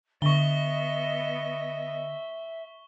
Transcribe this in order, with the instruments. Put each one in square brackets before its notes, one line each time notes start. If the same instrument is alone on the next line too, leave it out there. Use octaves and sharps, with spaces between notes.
[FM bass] D3 [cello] B3 D#5 [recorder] E5 [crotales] C#6 G7